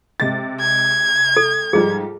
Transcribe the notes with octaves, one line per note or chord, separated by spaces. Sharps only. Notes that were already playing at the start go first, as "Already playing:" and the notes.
C3 G#3 A6
G#6
A4
G#2 F3 G3 G#4